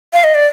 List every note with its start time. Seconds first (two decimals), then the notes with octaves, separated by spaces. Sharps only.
0.13 F5
0.24 D#5
0.34 D5